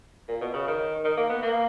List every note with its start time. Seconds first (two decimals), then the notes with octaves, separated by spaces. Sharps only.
0.28 A#2
0.41 B2
0.54 C#3
0.67 D#3
1.05 D#3
1.17 A#3
1.30 B3
1.42 A#3